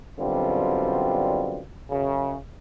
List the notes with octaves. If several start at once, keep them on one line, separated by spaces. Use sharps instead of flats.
F#2 B2 D3 G3 C4 F4
F#2 C#3